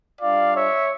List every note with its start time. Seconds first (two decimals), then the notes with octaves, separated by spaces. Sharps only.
0.21 G3 D4 F4 D5 F5
0.54 C#5 E5